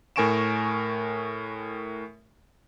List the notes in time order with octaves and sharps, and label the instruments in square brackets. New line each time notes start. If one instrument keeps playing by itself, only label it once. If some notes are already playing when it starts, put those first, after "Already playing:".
[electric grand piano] A2 A#4 G#5 C#6 D7 E7